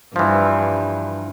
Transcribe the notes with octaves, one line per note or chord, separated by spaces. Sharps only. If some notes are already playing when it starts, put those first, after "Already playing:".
G2 E3 F3